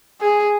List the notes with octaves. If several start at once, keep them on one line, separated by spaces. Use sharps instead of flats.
G#4